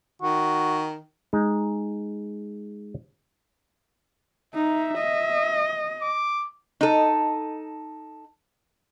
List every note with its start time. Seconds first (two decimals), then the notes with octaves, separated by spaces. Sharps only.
0.22 D#3 F#4
1.33 G#3 D#4
4.54 D#4 E5
4.98 D#5
6.01 D6
6.81 D#4 A4